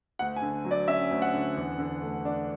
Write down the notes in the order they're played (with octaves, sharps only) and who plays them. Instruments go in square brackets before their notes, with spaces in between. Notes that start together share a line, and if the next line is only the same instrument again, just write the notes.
[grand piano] D2 F#5
G#5
D3
F#3
D5
C#4 E5
D2
F#5
D3
E2
D3
A3
D4